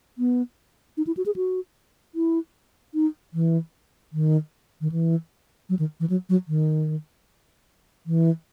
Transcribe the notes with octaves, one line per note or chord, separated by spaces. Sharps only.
B3
D#4
E4
F#4
G#4
F#4
E4
D#4
E3
D#3
D#3
E3
F#3
D#3
E3
F#3
F#3
D#3
E3